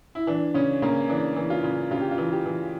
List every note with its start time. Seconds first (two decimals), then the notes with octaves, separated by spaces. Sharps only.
0.15 E4
0.27 E3 D4
0.54 C#3 C#4
0.82 C#3 A#3
1.09 E3 D4
1.36 E3
1.50 F4
1.64 C#3
1.91 C#3 F4
2.01 G4
2.11 F4
2.18 E3
2.32 G4
2.46 E3